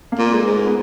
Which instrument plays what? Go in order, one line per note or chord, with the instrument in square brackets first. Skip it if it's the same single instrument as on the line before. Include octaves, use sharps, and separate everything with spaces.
[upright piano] A#3
[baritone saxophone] A#2
[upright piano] G#3
[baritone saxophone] G#2
[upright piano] G#3
B3